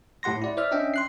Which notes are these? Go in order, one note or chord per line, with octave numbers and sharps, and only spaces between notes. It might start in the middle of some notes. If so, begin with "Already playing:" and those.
A2 G4 F#5 C6 A#6
E4 D5
C5 D5 E5 F6
C#4 D4 D#5 E5 G5
C6 F#6 C7